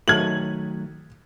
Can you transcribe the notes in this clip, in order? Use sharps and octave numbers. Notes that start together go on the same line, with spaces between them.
D#3 F#3 A3 G#6 F#7